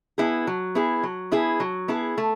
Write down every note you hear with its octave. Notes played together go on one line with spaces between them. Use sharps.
B3 E4 G#4
F#3
B3 E4 G#4
F#3
B3 E4 G#4
F#3
B3 E4 G#4
A3